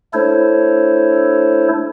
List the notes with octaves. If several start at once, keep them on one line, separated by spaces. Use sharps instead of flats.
A3 D4 E4 A4 C5 C#5